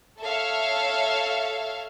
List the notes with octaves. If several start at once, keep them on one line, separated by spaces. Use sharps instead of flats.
A4 C#5 E5 F5